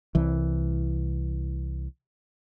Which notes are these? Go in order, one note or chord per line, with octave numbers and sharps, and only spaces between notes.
C2 E3